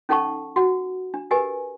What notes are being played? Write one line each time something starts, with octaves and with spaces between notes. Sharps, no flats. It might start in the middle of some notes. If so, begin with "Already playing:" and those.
C#4 D#4 A4 F#5 A5 C#6
F#4 F#5
D4
G4 A#4 B4 D#5 G#5